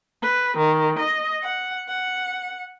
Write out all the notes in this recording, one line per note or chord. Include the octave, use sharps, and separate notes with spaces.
B4
D#3
D#5
F#5
F#5